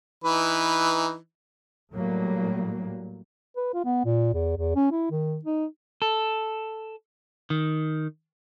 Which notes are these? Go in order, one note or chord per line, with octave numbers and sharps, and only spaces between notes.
E3 D#4 B4
A2 F#3 G3 A#3
B4
F4
B3
A#2
E2
E2
C#4
E4
D#3
D#4
A4
D#3